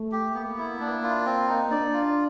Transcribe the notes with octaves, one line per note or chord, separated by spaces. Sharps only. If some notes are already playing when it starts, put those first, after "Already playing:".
Already playing: A3
G4
A#3 B3
E4
A#3 D4
F4
C4
D#4
D4 D5
F4